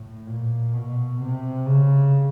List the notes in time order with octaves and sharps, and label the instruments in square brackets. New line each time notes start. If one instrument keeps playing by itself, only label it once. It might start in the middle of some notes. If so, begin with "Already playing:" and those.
Already playing: [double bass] A2
A#2
B2
C3
C#3